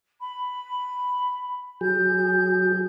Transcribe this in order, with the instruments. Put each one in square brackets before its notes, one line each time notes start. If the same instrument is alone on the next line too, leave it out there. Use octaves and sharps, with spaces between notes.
[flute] B5
[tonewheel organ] F#3 G#4 [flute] G6